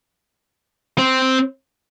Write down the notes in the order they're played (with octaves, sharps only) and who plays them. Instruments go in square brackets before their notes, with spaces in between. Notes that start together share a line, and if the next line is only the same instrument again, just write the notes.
[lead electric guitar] C4